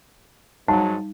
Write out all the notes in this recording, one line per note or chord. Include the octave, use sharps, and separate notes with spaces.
G#2 F#3 G3 D#4 A5